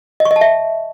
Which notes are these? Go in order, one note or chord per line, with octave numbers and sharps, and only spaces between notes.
D#5
C#6
D#5
A5
E5